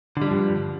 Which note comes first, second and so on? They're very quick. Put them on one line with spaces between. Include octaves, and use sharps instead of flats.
D3 G3 F3 G2